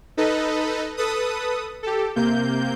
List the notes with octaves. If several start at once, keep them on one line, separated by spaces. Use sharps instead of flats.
D#4 A4 B4 D#5
A4 B4 D#6
G4 A4
C3 A#3 G6